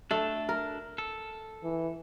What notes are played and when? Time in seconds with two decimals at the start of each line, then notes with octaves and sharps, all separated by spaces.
0.11 A3 D4 A4
0.49 A#4
0.98 A4
1.64 E3